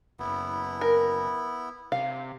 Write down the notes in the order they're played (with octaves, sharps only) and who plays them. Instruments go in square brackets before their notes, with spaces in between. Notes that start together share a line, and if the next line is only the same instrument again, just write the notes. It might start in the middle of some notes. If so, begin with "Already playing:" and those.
[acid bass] F#1 [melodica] B3 E4
[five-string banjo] A#4
[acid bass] C3 [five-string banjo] F5